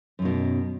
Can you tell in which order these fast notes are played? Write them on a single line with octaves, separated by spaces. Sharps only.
F#2 D#3 B2